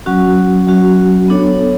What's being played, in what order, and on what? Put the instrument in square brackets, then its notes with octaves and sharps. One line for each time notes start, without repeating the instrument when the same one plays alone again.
[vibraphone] F#3 C#4 F#4
F#3 C#4 F#4
B3 D4 A4 C#5